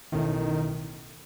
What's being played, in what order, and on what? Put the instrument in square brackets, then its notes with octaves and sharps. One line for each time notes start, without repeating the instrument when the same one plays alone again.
[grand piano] B1 A2 E3 A3 C#4 [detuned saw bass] D#3